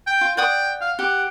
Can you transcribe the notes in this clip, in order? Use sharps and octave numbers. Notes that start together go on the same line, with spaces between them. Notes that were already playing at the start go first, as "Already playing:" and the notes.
G5
F4
D5 F#5 G5 D#6
F5
G4 F#5